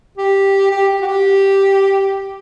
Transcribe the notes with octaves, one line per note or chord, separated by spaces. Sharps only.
G4
G4
G4
F#4
G4